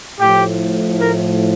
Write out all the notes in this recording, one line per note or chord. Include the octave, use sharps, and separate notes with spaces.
A2 F3 G4
A#4